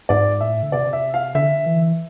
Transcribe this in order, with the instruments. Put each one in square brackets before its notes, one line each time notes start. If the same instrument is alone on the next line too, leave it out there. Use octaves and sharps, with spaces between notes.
[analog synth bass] G#2 [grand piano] D5
[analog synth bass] A2 [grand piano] E5
[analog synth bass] D3
[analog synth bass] C3 [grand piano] D5
[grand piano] E5
F5
[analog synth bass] D3 [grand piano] E5
[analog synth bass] E3